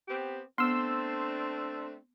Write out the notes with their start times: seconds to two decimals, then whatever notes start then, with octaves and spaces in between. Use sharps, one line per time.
0.08 B3 C4 G4
0.58 A3 B3 C4 D4 C6 E6